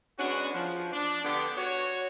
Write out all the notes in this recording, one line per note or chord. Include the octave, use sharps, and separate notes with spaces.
G#3 B3 C#4 D4 F#4
F3
D4
D3 B3 G4
F#4 C#5